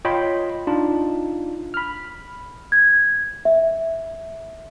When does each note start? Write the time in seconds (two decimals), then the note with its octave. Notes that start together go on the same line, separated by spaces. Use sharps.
0.05 F4 C#5 D#5 G5 B5 C6
0.67 D4 D#4 F4
1.74 B5 F6
2.72 G#6
3.45 E5